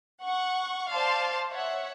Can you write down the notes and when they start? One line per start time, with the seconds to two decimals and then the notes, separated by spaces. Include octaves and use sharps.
0.24 F#5 C#6
0.92 C5 D5 F5 A5 C6
1.52 C#5 E5 F#5